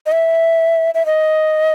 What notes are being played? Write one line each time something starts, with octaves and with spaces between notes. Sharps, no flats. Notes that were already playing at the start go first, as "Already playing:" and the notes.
D#5
E5
E5
D#5